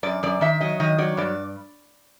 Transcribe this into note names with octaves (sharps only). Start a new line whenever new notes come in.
F#2 D5
F#2 D5
D#3 E5
F#3 D#5
D#3 D#5
F#3 D5
G2 D5